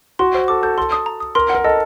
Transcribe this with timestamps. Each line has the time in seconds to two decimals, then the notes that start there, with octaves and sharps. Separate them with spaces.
0.19 F#4 C6
0.34 C5
0.48 A4 D6
0.63 A4 G6
0.78 A4 C6
0.92 D#6
1.06 A#5
1.20 D#6
1.35 A#4 C6
1.50 F#5
1.55 A#4
1.64 A4 D#5